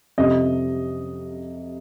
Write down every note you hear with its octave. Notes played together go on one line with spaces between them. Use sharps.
F2 C3 G3 D#5